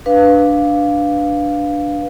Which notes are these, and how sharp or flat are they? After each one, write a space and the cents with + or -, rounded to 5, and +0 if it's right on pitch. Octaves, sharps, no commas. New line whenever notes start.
D4 +0 B4 +0 F5 +0